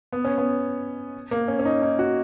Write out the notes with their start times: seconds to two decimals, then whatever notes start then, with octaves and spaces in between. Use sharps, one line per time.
0.13 B3
0.24 C#4
0.38 B3
1.31 A#3
1.48 C#4
1.59 C#4
1.65 D#4
1.82 D#4
1.99 F#4